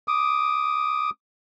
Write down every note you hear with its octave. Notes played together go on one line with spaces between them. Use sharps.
D6 D#6